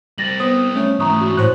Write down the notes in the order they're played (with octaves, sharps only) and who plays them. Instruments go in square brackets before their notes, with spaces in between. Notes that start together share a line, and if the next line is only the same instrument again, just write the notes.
[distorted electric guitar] G3 C4 [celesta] A6 A#6 F#7
[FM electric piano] B3 C5 [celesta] D#6
[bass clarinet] A3 [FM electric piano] C#4
[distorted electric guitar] G#2 E3 [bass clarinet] A3 [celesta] A#5 C#6 D#6
[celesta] F#4
[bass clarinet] A2 [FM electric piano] C5 C#6 F#6